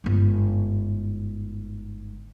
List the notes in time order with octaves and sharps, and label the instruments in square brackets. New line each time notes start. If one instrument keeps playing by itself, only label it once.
[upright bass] G1 G#2